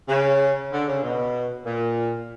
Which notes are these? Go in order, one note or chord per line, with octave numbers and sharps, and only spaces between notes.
C#3
D3
C#3
B2
A#2